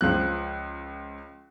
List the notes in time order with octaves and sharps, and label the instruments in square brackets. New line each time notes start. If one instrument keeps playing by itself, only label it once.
[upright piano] C#2 F3 F#6